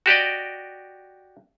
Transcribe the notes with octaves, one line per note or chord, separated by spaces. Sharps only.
F#4 G4 D5 D#5